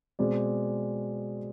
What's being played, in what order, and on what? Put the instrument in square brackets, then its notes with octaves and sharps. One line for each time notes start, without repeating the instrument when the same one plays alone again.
[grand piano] B2 G#3 C4 G#4 D5